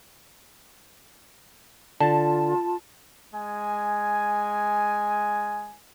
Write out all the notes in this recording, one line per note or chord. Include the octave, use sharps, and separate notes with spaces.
D3 F4 A5
G#3 G#5